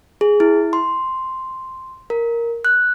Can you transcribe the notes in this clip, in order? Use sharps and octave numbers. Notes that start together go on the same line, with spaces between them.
G#4
E4
C6
A#4
F#6